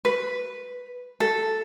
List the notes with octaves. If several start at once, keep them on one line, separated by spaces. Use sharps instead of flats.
B4
A4